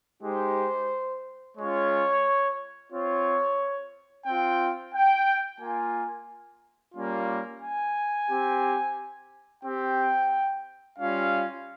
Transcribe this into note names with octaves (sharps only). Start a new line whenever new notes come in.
G#3 D#4 G4 C5
G#3 C#4 F4 C#5
C4 F4 C#5
C4 F4 G5
G5
A#3 F4 G#5
G3 A#3 C#4 F4
G#5
C4 G4
C4 G4 G5
G3 C#4 F4 F5